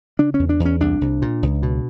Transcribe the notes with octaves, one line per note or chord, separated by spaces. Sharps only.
C#3 D4
C#4
E2
D4
E2
C#4
C2 D4
C2
A#2
C#2
B2